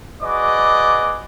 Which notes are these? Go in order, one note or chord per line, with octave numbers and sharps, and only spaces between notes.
F#4 G#4 B4 D5 D#5 D6